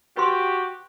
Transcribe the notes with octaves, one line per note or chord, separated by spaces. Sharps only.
F#4 G4 B4 B5 C6